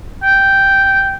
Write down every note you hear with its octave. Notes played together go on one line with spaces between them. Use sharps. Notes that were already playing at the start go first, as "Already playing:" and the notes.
G5